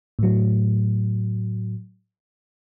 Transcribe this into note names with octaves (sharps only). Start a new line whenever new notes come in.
A2 F#3